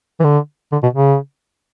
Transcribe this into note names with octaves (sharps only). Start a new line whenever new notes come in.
E3
D3
D3
B2
C#3